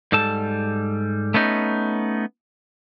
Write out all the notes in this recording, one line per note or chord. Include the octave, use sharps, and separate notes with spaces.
G#2 G3 A4 A5
A3 B3 C#4 D#4